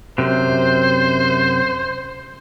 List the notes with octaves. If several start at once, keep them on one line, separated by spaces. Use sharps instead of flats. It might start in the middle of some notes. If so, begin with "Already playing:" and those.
F#2 C3 C5